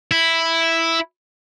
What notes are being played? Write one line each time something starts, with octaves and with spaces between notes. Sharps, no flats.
E4